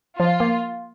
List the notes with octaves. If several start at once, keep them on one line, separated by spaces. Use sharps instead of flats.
F3 F4
A#3